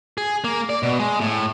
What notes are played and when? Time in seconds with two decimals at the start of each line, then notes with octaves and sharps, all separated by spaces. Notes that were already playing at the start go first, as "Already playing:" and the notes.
0.18 G#4
0.44 A#3
0.70 D5
0.83 B2
0.99 G#3
1.21 A2